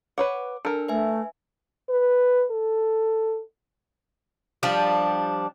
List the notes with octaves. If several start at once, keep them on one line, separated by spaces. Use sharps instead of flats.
B4 C#5 F#5 D6
D4 A4 A#4
A3 B4 E5 G#5
B4
A4
F3 G3 D4